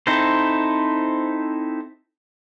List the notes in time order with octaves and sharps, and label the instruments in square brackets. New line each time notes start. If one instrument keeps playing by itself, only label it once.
[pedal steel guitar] C4 D#4 E4 A4 C5